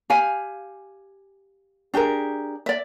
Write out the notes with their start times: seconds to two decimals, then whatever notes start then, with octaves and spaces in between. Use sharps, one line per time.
0.10 G4 F5 G#5
1.94 D4 G4 G#4 A#4
2.66 D5 E5